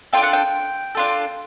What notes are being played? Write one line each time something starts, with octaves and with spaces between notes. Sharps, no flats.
D4 F4 A4 G5
F#5
G5
D4 F4 A4